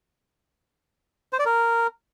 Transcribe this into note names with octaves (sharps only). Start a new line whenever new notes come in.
C5
D5
A#4